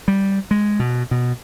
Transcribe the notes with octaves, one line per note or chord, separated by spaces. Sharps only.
G3
G#3
B2
B2